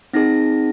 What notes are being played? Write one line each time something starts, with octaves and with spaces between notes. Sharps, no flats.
C4 D#4 G#4 A#6